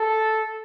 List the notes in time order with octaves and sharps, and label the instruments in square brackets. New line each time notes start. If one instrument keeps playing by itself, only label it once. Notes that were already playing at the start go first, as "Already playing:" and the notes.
Already playing: [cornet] A4